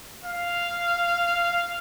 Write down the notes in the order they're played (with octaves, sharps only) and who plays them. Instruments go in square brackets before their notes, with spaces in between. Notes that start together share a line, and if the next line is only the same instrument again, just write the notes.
[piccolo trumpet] F5